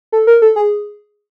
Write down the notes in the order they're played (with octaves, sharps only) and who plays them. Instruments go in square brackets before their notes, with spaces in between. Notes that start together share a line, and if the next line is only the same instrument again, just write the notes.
[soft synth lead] A4
A#4
A4
G#4